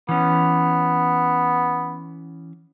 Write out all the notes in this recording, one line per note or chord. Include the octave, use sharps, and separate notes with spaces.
E3 B3 C#4